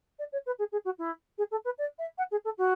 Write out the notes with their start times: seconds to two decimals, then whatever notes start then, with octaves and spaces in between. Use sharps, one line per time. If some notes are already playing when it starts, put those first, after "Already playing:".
0.19 D5
0.32 C#5
0.46 B4
0.59 G#4
0.72 G#4
0.85 F#4
0.99 E4
1.38 G#4
1.51 A4
1.65 B4
1.78 D5
1.99 E5
2.18 F#5
2.31 G#4
2.45 A4
2.58 F#4